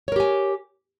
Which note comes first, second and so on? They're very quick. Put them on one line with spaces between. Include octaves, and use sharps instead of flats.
C#5 A#4 G4 G#5